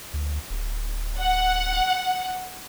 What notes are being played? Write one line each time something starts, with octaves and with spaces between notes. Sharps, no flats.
D2
D1
F#5